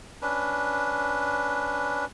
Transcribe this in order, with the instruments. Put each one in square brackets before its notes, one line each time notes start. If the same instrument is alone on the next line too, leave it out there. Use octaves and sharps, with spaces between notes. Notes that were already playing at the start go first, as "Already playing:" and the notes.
[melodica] C#4 D4 B4